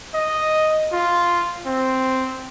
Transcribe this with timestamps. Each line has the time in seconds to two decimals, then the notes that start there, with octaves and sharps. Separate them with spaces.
0.14 D#5
0.93 F4
1.66 C4